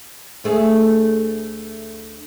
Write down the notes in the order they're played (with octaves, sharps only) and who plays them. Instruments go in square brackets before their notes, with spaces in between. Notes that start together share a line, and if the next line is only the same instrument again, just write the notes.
[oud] D2 A3 G#4